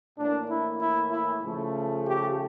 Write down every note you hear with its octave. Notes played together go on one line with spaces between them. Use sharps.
A2 E3 A#3 D4
E4
E4
E4
C#3 F3 A3
G4